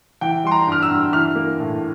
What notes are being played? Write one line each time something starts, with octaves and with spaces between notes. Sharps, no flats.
E3 G5
G3 C6
A#5
G2 F6
E6
G2
E3 F6
A#3
A2